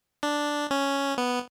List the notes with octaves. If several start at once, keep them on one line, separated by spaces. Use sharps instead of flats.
D4
C#4
B3